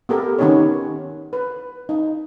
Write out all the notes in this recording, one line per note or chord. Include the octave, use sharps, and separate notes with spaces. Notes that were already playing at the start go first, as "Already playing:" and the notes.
B3 G4 A4 A#4
D#3 B3 C#4 D#4 G4 C#5
B4
D#4